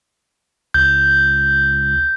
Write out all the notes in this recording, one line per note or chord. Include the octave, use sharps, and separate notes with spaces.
C#2 G6